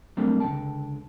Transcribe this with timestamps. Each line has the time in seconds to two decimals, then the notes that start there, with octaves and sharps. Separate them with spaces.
0.17 F#3 G3 A3 A#3 C4 D4
0.40 C#2 D3 A3 G#4 G5 A5